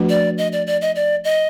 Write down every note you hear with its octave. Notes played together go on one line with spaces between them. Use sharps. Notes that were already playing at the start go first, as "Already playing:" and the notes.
Already playing: F3 A3 D4 F#4 B4
D5
D#5
D5
D5
D#5
D5
D#5